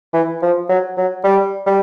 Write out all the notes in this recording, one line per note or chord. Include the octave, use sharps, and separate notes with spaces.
E3
F3
F#3
F#3
G3
G3